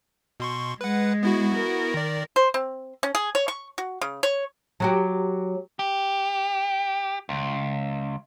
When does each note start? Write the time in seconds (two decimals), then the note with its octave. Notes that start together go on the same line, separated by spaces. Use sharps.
0.40 B2 C6 C#6
0.81 G#3 B4 F#5
1.23 B3 E4 F#4
1.55 A#4
1.94 D#3 D5
2.36 C5
2.54 C4
3.03 C#4
3.15 G#4
3.35 C#5
3.48 C#6
3.78 F#4
4.01 C#3
4.23 C#5
4.80 F#3 F#4 G4
5.79 G4
7.29 C#2